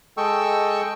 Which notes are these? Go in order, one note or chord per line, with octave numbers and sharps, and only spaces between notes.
G#3 A4 D#5 G5 C#6 E6